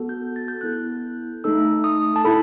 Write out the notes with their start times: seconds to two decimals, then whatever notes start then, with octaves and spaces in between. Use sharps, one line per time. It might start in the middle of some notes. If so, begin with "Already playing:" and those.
Already playing: B3 F#4 A4
0.09 G6
0.36 A6
0.48 G6
0.61 B3 E4 A4 F#6
0.73 G6
1.44 A3 D#4 A4 E6
1.84 D#6
2.16 A5
2.25 E4 A4 B5